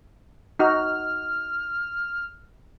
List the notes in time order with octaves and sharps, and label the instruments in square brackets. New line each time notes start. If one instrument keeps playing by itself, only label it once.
[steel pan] D#4 F#4 [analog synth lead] F6